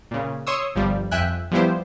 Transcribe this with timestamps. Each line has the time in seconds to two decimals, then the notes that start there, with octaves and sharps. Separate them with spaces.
0.11 A#2 C#3
0.47 C#5 C6 C#6 D#6 E6
0.75 G1 F3 G3
1.11 F2 E5 G5 G#5 F#6
1.51 F3 G3 B3 E4 G4 C5